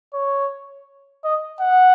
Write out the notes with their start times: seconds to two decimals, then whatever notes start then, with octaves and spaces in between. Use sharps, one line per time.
0.14 C#5
1.24 D#5
1.60 F#5